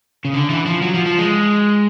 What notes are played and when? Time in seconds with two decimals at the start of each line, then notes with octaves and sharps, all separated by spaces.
0.25 C#3
0.34 D3
0.50 E3
0.66 F3
0.82 F#3
0.94 F3
1.06 F3
1.18 G#3